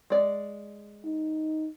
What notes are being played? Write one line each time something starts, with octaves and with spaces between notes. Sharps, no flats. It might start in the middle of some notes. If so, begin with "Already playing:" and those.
G#3 D5
D#4